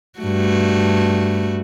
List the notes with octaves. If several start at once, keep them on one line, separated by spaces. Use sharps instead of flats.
G2 A3 F#4